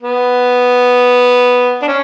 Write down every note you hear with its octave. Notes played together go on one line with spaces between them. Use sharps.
B3
D4
C#4